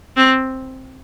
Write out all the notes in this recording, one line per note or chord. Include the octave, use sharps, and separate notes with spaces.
C4